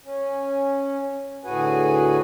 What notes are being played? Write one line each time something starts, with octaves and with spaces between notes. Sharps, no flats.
C#4
D2 A2 F#4 G#4 B4 G#5